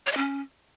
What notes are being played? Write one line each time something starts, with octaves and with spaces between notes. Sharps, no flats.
C#5
D#5
C#4